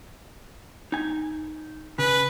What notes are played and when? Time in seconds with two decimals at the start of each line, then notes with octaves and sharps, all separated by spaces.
0.92 D#4 G#5
1.98 C#3 B4